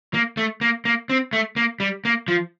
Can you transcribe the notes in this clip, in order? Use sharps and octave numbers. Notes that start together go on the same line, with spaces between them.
A#3
A3
A#3
A#3
C4
A3
A#3
G3
A#3
F3